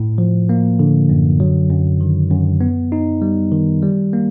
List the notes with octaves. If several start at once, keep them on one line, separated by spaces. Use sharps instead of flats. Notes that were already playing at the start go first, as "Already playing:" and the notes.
Already playing: A2
F3
A#3
D3
F#2
F#3
F#2
D#3
F#2
B3
D#4
G3
D#3
G3
A#3